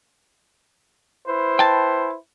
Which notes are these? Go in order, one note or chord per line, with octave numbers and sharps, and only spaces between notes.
E4 B4 C5
G5 A5